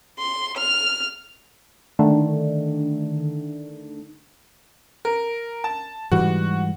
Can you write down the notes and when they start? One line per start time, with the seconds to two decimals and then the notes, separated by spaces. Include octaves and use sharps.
0.19 C6
0.58 F6
1.99 D3 D#3 A3 D4
5.05 A#4
5.64 A5
6.12 G#2 E3 G3 F#4